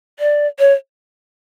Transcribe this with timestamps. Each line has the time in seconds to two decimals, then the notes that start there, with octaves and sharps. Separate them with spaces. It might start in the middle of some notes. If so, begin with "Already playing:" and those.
0.19 D5
0.59 C#5